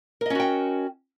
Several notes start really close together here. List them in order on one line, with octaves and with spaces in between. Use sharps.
A#4 D#5 C#4 F#4 G5